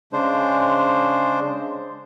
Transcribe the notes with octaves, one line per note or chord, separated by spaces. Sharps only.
C#3 G#3 D4 C5